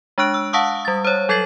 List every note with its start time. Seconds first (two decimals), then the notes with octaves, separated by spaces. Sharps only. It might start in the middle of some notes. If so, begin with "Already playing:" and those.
0.18 G#3 D4 C#6 F#6 D7
0.34 E6
0.53 F5 F#5 A5 C#6 D#6 E6
0.85 G3 A6
1.05 C5 C#5
1.29 F#3 A4 G#6 A6 C7 F#7